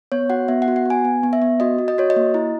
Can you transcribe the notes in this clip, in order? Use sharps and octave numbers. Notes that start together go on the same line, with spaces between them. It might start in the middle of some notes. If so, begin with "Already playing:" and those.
B3 C#5
F#4 F#5
B3 E5
F#5
F#4
F#5
B3 G#5
B3
B3
E5
B3
F#4 D#5
F#4
D#5
F#4 C#5
D#5
A#3
E4